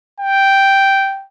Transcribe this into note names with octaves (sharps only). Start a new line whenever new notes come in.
G5